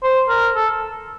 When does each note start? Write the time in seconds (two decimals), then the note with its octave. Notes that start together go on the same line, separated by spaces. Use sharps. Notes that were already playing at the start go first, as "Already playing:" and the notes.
0.03 C5
0.29 A#4
0.55 A4